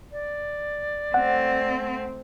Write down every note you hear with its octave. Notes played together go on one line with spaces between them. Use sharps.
D5
A3 C4 F#5